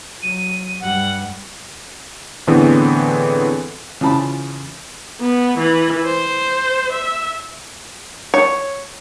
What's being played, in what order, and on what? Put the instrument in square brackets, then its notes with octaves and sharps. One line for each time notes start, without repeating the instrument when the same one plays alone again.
[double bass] F#3 [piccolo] D#7
[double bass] G2 G3 [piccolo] F#5
[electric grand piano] A2 D3 E3 B3 C4 G#4
[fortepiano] C#3 E3 F4 A5 B5
[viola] B3
E3
C5
E5
[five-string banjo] C#5